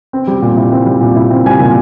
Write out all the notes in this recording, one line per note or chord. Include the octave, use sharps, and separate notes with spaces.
C4
G3
A#2
E4
C4
G3
A#2
E4
C4
G3 G#5
A#2